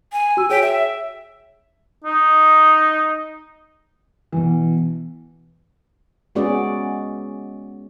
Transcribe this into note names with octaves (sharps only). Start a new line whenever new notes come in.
G#5
F#4 E6
G#4 C#5 G5 B6
E5
D#4
B2 E3
G#3 B3 C#4 F#4 G#4 D5